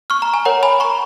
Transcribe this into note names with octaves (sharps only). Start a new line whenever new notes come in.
C#6 F6
A#5
G#5
A#4 C#5 F#5 A#5
G#5 B5
A#5 C#6